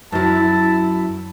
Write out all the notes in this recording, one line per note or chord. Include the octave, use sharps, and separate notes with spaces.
F#2 F#3 E4 A5